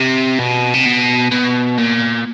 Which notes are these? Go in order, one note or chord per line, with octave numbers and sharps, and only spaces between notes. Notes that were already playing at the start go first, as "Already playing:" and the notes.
Already playing: C3
B2
C3
B2
B2
A#2